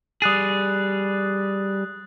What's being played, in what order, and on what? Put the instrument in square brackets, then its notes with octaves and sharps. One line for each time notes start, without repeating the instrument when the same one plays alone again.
[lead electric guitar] G3 G#4 [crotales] D#6 F#6 A6